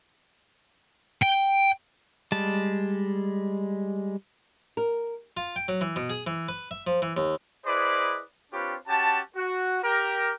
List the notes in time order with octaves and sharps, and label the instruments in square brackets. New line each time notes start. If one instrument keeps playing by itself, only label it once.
[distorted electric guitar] G5
[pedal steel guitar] G3 G#3 A5
[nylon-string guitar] A#4
[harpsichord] F4
G5
F#3
E3
B2
G#4
E3
B4
E5
F3
E3
D#2
[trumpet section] E4 G#4 B4 C5 D5 D#5
C4 D4 F4 G4 B4 C#5
C#4 F#4 G4 A5
F#4
G4 A#4 G5